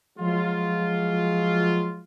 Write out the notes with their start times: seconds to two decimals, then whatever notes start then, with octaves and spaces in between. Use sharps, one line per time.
0.19 F3 F#3 G#3 F4